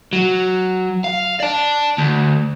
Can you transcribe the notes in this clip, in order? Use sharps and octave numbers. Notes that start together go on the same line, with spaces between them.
F#3
F5
D5 A5
D2